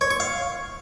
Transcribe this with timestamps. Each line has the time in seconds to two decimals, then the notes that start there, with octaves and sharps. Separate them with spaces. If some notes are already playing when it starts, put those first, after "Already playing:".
0.01 C#5
0.11 C#6
0.20 F5